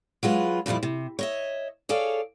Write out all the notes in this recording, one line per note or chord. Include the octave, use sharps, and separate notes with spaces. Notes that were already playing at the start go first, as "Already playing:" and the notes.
F#3 G#3 F4 B4
F2 A#2 F3 G3 E4
C3
C#5 D#5 E5
G#4 A4 C#5 D5 F5